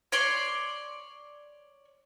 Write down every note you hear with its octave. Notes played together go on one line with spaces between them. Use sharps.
C#5 D5 C6